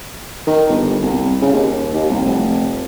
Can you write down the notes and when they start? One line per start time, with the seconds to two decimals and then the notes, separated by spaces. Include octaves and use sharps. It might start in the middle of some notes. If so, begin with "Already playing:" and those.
0.47 D#3
0.69 G1
1.02 C2
1.42 C#3
1.53 D#2
1.94 D#2
2.10 C2
2.25 F1